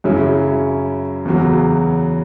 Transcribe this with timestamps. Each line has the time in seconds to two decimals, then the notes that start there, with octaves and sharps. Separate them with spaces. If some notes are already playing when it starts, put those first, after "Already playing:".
0.04 F#2 C#3 F#3 C#4 E4
1.25 E2 C#3 F#3